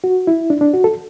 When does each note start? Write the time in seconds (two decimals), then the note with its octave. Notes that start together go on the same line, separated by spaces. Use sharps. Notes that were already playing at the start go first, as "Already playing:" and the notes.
0.04 F#4
0.27 E4
0.50 D4
0.61 D4
0.74 F#4
0.84 A4